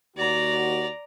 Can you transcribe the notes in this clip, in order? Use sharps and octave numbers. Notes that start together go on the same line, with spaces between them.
D#2 F#4 D5 A#5